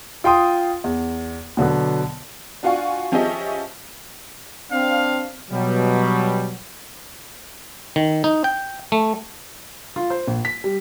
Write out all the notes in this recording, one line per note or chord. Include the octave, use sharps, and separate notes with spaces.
F4 G5 C6 D#6
E2
B2 D3 F#3 B3
D4 F4 F#4 F5 G#5 C#6
F3 C#4 G4 G#4 D#5 E5
C4 D4 F5
B2 F#3 G3
D#3
D#4
G5
A3
F4
C5
A#1
B6
G3